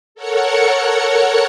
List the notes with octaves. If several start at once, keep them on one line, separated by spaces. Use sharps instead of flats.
A4 A#4 C#5 F#5 C#7